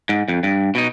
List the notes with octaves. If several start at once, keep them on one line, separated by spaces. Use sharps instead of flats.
G#2
F2
G2
B2 D#4